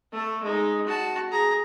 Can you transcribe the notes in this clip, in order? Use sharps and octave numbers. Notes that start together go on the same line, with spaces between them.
A3 A4
G#3 D#4
F#4 A5
G#4 A#5